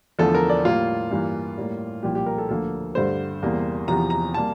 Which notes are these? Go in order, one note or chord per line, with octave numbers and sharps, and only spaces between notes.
E2 D3 F3 A3 A4
A#4
D5
A2 G3 A#3 F4
G2 E3 A#3
A2 G3 A#3
C2 A#2 F3 G4
G4
A#4
A4
D2 D3 F3 A#3 A4
G2 D3 A3 C5
E2 C3 G3 A#3
E2 C3 F3 A#5
A#5
C3 G3 A#3 A5